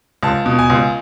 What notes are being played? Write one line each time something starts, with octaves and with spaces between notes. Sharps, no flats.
C#2 A5
B2
G#5
C#2